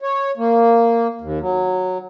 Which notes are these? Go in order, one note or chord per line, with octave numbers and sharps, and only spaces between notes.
C#5
A#3
D#2
F#3